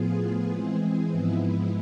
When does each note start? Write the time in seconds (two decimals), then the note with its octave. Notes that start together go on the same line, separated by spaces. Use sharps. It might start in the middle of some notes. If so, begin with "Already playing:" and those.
Already playing: A2 F3 B3 F4 G#4
0.51 E3 G#3 C4 G#4
1.11 G#2 F3 G#3 B3 E4